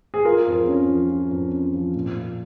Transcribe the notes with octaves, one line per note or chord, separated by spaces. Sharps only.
G#4
F4 A#4
F2
C#4
F3
F4
F2
C#4
F3
A#2
A#2